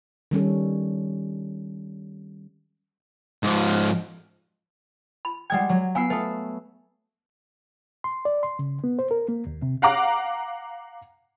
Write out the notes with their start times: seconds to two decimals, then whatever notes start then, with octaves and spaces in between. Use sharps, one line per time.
0.31 D#3 G3 C#4 A4
3.43 G#2 F3
5.25 B5
5.50 G3 G#3 F#5 G5 G#6
5.69 F#3
5.95 B3 F5 G#5 E6 C7
6.10 A3 B4 D#6
8.04 C6
8.25 D5
8.43 C6
8.59 C#3
8.84 B3
8.99 C5
9.11 A#4
9.28 A#3
9.47 D#2
9.62 C3
9.82 F5 F#5 A#5 D6